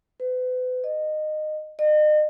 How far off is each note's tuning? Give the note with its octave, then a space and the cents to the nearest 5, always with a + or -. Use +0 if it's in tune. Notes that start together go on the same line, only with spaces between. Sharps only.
B4 +40
D#5 -20
D#5 -40